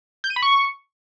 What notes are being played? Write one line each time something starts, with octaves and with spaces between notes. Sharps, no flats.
G6
D#7
B5
C#6